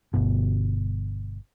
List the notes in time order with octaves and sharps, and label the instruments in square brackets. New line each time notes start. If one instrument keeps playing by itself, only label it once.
[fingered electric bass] G1 B2